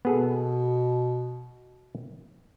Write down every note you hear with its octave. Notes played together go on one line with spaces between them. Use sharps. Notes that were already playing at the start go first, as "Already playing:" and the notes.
B2 B3 G#4 A4